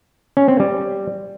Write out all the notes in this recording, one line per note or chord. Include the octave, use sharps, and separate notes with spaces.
C#4
C4
G3